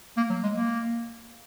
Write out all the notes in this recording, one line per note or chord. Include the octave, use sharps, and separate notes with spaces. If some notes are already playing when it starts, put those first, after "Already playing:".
A#3
F#3
G#3
A#3